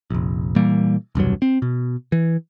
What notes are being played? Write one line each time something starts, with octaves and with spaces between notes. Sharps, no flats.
F1 A#1
A#2 E3 G3 A#3
E1 C2 G2 F#3
C4
B2
E3